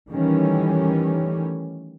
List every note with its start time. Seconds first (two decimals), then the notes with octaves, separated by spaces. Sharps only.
0.10 D#3 E3 G3 A3 C#4